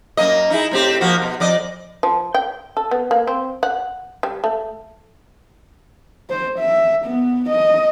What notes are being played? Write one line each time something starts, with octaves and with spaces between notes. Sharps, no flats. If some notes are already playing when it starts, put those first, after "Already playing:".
F#2 A#3 D#5
D#4 E4 G#4
A2 C4 G4
F3 A#3 F#4
B2
F2 D5 D#5
F3
G5
A4
B3
A#3
C4
F#5
G3
A3
C5
E5
B3
D#5